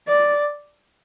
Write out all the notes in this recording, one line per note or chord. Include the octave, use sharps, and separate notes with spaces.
D5